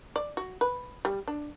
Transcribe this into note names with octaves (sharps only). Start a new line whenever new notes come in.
D5
F#4
B4
G3
D4